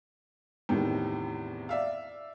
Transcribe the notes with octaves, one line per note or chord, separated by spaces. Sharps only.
E2 A2 C3 D#3
D5 E5 F5